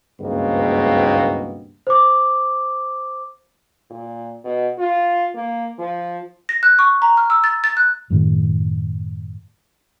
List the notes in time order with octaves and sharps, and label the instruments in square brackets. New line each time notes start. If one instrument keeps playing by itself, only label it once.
[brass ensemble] F#1 C#2 G2 B2 A#3 C4
[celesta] C5 D6
[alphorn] A#2
B2
F4
A#3
F3
[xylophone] A#6
F#6
C#6
A#5
F6
E6
A6
A6
F#6
[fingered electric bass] F#2 A2 D#3 A3